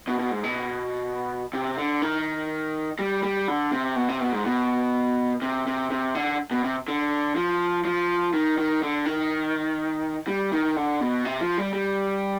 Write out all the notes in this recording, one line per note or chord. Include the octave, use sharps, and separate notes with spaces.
B2
B2
G#2
B2
C3
D3
D#3
G3
G3
D3
C3
B2
C3
B2
G#2
B2
C3
C3
C3
D3
B2
C3
D3
F3
F3
D#3
D#3
D3
D#3
G3
D#3
D3
B2
C3
F3
G3
G3